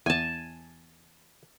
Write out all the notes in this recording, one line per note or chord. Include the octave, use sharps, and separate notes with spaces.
E2 G#5 A5